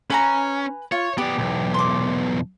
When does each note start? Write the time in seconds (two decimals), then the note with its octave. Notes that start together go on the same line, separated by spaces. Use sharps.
0.10 C#4 B4 G#5 A#5
0.92 F4 C#5
1.18 B3 G4 D5
1.38 B1 E2
1.74 C6 D6